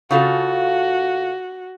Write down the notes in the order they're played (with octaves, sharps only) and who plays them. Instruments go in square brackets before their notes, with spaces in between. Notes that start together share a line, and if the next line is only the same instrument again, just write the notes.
[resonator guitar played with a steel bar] C#3 F4 A4 [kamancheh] F#4